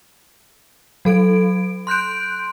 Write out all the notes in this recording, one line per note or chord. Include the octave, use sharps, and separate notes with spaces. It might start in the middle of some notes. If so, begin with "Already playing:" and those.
F#3 A4 D7
C6 F#6 G6 D7